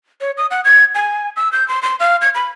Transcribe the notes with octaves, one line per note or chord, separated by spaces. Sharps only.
C#5
D#6
F#5
G#6
G#5
E6
G6
C6
C6
F5
G#6
B5